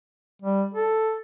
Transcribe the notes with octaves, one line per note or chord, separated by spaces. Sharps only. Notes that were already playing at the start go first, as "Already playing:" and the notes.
G3
A4